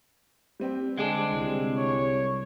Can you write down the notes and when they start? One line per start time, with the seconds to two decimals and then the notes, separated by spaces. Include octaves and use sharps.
0.60 G3 C4 G4
0.98 D3 G#3 C4 D4 G#4
1.33 C2
1.77 C#5